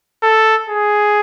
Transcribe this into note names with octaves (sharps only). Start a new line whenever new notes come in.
A4
G#4